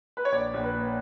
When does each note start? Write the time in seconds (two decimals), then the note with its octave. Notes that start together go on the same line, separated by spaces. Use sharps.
0.17 B4
0.25 C#5
0.32 A#1 D5
0.54 A#1
0.63 B4
0.74 A#2